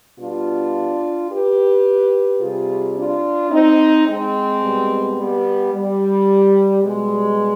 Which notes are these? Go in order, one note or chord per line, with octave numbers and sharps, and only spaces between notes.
B2 G3 D4 F4
G4 B4
C3 G3 F4 G#4
D4 F4
C4 D#4
G#3 C4
B2 G3
G3 B3
G3
B2 G3 G#3